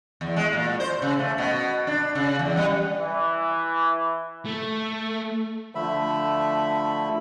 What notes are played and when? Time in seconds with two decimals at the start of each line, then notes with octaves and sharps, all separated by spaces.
0.21 E2
0.36 G#3
0.53 A#2
0.80 C5
1.02 C#3
1.19 A3
1.38 B2
1.87 D4
2.15 C#3
2.39 E2
2.57 G3
2.98 E3
4.46 A3
5.75 D3 F3 A3 E5 B5